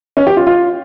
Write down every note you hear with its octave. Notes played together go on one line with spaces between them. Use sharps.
C#4
G4
F4
F4